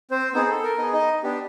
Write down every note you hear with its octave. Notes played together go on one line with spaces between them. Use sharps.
C4 C5
B3 C4 D#4 G#4 C5
A4
A#4
B3 D#4 G#4 D#5
D#4 D#5
B3 D4 G4